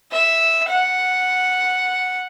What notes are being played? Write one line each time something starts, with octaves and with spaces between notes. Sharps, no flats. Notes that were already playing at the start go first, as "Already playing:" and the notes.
E5
F#5